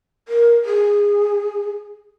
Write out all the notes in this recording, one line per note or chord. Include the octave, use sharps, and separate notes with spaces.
A#4
G#4